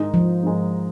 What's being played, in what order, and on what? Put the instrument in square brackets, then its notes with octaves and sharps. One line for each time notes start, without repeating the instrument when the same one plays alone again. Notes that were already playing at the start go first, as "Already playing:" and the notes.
Already playing: [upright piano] G#2 D#3 G#3 D#4
[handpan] F3
[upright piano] G#2 D#3 G#3 D#4